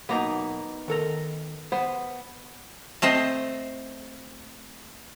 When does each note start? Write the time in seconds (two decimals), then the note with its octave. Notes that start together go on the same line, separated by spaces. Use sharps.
0.09 B1 A#3 B3 D#4 A#5
0.88 D#3 A4 A#4
1.72 B3 C5
3.02 A3 C4 C5 D#5